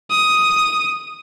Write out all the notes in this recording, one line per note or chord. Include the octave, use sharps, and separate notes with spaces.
D#6